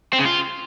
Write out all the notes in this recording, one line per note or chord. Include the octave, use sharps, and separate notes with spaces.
C4
C#3
F4